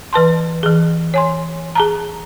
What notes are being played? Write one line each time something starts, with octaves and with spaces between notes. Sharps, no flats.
E3 B4 A5 C6
E3 G#4
C#5 G#5 C6
G#4 A5 A#5